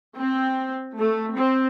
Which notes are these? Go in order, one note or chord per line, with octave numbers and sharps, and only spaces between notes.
C4
A3
C4